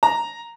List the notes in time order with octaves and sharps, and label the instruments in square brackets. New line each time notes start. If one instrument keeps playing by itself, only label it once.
[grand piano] A#5